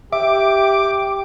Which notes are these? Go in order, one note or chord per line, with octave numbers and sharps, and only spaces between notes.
G4 E5 D6